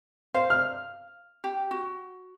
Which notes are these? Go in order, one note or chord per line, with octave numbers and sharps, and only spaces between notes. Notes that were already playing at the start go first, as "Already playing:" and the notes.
C5 F5
F6
G4
F#4